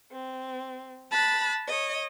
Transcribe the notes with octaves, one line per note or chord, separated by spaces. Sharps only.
C4
A5 B5 F#6
C#5 D#5